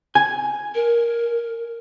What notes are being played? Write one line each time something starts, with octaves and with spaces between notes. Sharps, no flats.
G#5
A#4